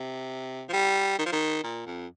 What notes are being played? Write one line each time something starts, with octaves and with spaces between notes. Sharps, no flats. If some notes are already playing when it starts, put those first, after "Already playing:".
Already playing: C3
F3
G3
D#3
F3
D#3
A#2
F2